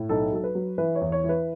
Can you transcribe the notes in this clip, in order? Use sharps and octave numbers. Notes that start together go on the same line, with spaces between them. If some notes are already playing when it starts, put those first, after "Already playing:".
Already playing: A2
B1 A4
F#3 A4
B4
F#3
E3 B4
C#5
E2
C#5
E3
B4